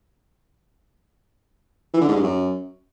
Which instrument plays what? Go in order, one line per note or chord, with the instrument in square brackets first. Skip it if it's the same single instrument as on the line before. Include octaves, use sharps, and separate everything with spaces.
[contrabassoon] E3
D3
G#2
G2
F#2